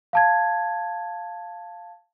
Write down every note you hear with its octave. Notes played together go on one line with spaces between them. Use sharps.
F5 A5 G#6